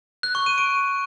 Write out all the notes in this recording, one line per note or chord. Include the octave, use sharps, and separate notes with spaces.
F#6
C#6
D#7
D7